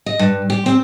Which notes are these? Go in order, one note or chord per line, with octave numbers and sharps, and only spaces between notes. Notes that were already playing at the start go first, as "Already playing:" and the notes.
D#5
G2
G4
C4